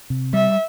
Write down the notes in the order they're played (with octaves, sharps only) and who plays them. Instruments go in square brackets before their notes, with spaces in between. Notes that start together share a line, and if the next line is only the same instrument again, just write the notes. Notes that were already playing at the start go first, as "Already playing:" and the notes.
[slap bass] C3
[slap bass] G3 [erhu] E5